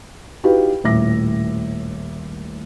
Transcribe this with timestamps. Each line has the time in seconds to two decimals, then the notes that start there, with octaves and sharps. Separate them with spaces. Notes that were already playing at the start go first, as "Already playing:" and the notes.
0.44 D#4 E4 F#4 G4 B4 F5
0.84 D#1 A2 E5 D6 A#6